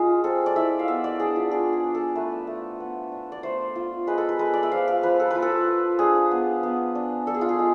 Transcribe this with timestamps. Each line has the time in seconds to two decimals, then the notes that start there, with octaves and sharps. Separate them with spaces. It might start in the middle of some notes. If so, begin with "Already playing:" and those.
Already playing: G#3 F4 G#4
0.24 C4 A4
0.46 D5
0.56 E4 E5
0.79 F5
0.88 B3 E5
1.04 D5
1.20 D4 G#4
1.36 F4
1.51 D4 G#4
1.73 G#4
1.84 D4
1.95 A4
2.15 A3 B4
2.47 A3
2.80 B3
3.12 D4
3.32 D5
3.43 A3 C5
3.75 F4
4.07 G#3 B4
4.18 A4
4.29 B4
4.39 G#3 B4
4.54 D5
4.63 E5
4.72 F3 F5
4.88 F5
5.03 F3 B4
5.20 A4
5.30 F4 B4
5.42 A4
5.67 F4
5.99 D4 G#4
6.31 B3
6.63 B3
6.95 D4
7.27 D4 A4
7.34 G#4
7.41 F4
7.49 G#4
7.59 G#3